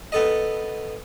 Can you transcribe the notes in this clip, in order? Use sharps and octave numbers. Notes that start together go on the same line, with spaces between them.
B3 A4 D#5